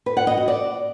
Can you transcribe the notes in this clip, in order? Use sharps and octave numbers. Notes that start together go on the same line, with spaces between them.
B4
F#5
D#5
F#4
D5